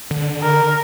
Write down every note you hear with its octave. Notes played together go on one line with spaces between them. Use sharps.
D3
A#4